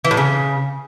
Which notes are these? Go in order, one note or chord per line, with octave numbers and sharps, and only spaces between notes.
E3
A2
C#3